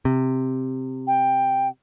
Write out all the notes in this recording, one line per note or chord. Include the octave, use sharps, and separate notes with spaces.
C3
G5